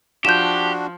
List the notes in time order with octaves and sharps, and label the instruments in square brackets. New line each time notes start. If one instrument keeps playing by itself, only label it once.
[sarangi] F3 [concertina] D4 F#4 [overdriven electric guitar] G4 [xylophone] G6 E7